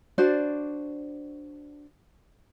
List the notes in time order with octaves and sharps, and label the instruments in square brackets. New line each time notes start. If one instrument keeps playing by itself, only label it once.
[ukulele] D4 F#4 C5 D5